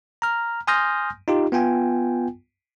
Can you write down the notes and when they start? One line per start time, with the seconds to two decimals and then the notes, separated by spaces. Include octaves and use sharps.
0.22 A#5 F6
0.67 G#5 C6 D#6 F6 G6 A#6
1.28 D#4 F4 G4
1.52 B3 F4 G5 G#5